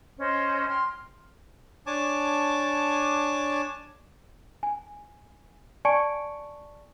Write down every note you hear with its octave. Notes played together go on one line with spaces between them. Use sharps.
C#4 C5 D#5
G5 C6 F6
D4 C#5 G#5 A5 D6
G#5
D5 G#5 A5 C#6 C#7 D7